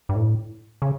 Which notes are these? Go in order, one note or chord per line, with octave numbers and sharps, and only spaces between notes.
G2
A2
C#3